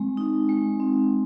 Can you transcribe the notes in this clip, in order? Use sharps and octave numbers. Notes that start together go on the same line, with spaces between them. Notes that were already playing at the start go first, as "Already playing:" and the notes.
Already playing: G#3 C4
D#4
G#3
C4